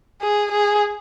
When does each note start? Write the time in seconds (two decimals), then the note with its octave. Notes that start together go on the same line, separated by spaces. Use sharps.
0.21 G#4
0.51 G#4